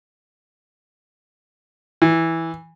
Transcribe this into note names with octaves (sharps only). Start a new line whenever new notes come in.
E3